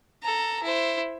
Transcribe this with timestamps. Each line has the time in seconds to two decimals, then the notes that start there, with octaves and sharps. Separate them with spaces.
0.23 A4 A#5
0.62 E4 C5